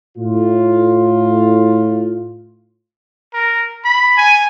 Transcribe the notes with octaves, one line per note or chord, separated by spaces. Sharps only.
A2 F4
A#4
B5
G#5